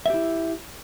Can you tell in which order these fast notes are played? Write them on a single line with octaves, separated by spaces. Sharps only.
E5 G4 E4